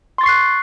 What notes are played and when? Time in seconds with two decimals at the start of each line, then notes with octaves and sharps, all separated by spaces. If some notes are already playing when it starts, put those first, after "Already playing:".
0.18 C6
0.21 A6
0.23 C#6
0.26 C7
0.29 F#6